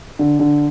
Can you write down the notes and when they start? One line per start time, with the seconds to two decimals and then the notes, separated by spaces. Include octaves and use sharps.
0.19 D3
0.39 D3